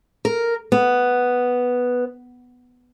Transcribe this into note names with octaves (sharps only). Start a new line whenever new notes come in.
A#4
B3